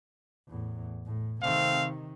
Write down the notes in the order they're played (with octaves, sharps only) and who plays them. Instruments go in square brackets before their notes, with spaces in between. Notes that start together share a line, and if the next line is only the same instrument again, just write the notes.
[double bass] E2 A2
A2
[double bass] C3 D#3 [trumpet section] A3 C4 F5